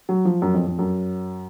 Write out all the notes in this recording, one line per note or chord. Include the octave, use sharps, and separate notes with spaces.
F#3
F3
F#2
F2
F2
F#2